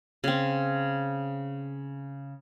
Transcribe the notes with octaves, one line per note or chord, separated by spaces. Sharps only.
C#3 C4